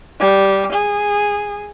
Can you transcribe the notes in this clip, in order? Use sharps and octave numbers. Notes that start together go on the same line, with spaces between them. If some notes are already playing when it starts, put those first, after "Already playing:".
G3
G#4